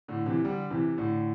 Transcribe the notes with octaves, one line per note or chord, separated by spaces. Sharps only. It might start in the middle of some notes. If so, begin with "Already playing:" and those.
A2 D3
C3 E3
D3 G3
C3 E3
A2 D3